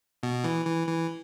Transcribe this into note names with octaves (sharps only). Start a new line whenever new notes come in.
B2
E3
E3
E3